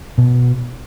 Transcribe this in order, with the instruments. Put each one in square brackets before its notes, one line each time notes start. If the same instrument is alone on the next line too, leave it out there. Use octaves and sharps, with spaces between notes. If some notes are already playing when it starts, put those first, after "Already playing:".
[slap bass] B2